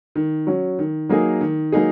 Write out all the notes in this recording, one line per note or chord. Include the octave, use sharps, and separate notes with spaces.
D#3
F#3 C#4
D#3
F#3 A#3 D#4 G#4
D#3
F#3 A#3 D#4 G#4